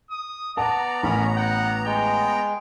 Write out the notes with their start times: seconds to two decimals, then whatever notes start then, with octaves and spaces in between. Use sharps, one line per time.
0.11 D#6
0.57 B3 D5 F#5 A5 A#5
1.03 A1 C#4 A#4 B5
1.36 F#5 G5
1.86 G#3 G5